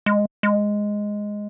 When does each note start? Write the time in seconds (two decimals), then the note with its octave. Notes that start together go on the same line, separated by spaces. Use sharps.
0.06 G#3
0.43 G#3